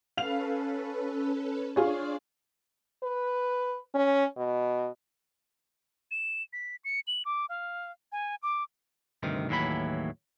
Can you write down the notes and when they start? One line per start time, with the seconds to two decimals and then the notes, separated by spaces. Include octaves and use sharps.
0.17 C#4 A4 B4 F5 F7
1.76 D4 F4 G#4 C#5 D5
3.03 B4
3.95 C#4
4.37 B2
6.11 E7
6.53 B6
6.85 C#7
7.07 F#7
7.25 D6
7.49 F5
8.12 G#5
8.43 D6
9.23 D2 G2 C3 D#3
9.49 D#2 A2 E3 F#3 B5